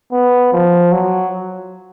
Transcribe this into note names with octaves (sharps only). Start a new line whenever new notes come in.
B3
F3
F#3